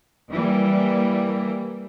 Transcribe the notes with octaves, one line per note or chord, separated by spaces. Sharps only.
E3 G3 A#3